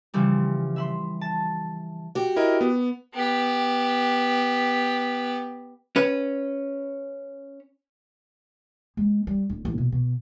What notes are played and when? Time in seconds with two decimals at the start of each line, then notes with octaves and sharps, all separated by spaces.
0.14 C#3 E3 F3 G3
0.76 E5 B5 C6
1.21 A5
2.15 F#4 G4
2.36 E4 A#4 D#5
2.61 B3
3.14 B3 G4
5.96 C#4 B4
8.97 G#3
9.27 G3
9.50 D1
9.65 A1
9.78 B2
9.92 B2